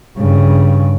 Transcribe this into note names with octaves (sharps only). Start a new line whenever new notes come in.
G2 C#3